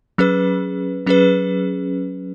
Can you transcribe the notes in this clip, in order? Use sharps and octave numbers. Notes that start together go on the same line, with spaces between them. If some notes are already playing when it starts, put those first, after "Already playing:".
F#3 C#4 G#4 B4
F#3 C#4 G#4 B4